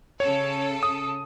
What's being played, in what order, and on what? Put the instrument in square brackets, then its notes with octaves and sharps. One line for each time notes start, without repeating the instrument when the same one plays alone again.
[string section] C#3 A4 [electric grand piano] C#5
[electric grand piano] D#6